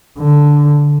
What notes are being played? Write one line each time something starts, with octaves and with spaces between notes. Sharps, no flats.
D3